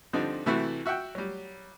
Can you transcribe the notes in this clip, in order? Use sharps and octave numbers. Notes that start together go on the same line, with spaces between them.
D3 F3 G3 C4 D4 D#4
C3 E3 A3 E4 F#4
F#4 E5 F#5 G5
F#3 G3